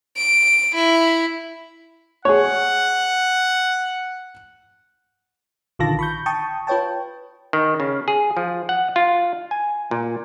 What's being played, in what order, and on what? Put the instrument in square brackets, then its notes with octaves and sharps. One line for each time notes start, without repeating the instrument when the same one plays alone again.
[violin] D7
E4
[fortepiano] G#4 C#5 [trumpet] F#5
[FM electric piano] A#1 D3 D#3 F4 A5 A#6
B5 C#6 G6
G5 A5 C#6 D#6
F4 B4 C#5 G5 A5
[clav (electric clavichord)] D#3
C#3
G#4
F3
F#5
F4
G#5
A#2